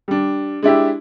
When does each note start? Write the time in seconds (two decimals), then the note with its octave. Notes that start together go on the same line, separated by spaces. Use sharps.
0.08 G3 D4
0.63 G#3 D4 E4 G4